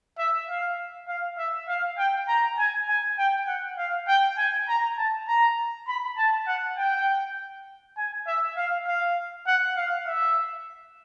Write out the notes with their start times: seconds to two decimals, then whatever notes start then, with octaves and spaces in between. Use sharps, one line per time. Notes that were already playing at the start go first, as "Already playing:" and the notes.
0.18 E5
0.48 F5
1.08 F5
1.38 E5
1.68 F5
1.98 G5
2.28 A#5
2.58 G#5
2.88 G#5
3.18 G5
3.48 F#5
3.78 F5
4.08 G5
4.37 G#5
4.68 A#5
4.97 A5
5.28 A#5
5.88 B5
6.17 A5
6.47 F#5
6.77 G5
7.97 G#5
8.27 E5
8.57 F5
8.87 F5
9.47 F#5
9.76 F5
10.07 E5